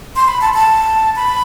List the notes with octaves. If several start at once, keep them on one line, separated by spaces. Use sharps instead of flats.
C6
B5
A5
A5
B5